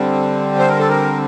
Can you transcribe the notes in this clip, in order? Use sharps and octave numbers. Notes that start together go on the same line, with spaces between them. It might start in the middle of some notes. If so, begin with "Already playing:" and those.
Already playing: D3 G3 C4
C5
A#4
A4
A#4